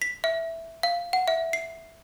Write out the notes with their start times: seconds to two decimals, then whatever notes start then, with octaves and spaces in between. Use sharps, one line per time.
0.02 B6
0.24 E5
0.83 F5
1.13 F#5
1.28 E5
1.53 C7